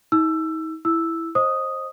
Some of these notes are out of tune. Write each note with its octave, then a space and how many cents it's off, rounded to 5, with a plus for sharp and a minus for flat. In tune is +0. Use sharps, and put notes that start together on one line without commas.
D#4 +45 E6 +20
E4 +0 E6 +0
C5 +25 D#5 +0 D#6 +0